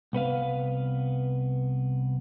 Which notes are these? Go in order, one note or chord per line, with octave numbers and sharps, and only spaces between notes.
C2 B3 B4 F5